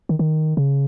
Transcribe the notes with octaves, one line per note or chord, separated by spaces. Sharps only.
D#3
D#3
C#3